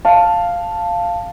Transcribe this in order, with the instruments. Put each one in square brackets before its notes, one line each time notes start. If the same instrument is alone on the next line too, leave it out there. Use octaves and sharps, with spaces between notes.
[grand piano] F5 A5